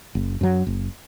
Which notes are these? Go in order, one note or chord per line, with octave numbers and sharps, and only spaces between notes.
F#1
F#2 F#3
F#1